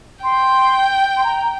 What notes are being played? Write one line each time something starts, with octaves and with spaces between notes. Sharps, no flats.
G5 C6
C6
A#5